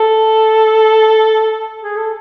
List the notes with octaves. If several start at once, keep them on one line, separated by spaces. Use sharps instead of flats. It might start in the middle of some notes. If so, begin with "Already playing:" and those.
Already playing: A4
G#4
A4